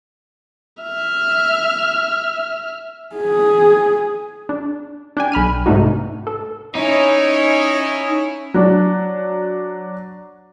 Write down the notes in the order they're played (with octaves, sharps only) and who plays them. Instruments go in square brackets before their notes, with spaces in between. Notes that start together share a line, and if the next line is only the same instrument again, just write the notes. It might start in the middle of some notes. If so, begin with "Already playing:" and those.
[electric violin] E5 F6
[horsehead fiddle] G#4
[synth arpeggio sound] D4
D4 G5 G#5
B1 B5 F6 D#7
G#2 C3 A3 D4 D#4 F#4
A4
[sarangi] C#4 [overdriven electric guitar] D#4 [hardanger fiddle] E4 C#5
[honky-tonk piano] F#3 D4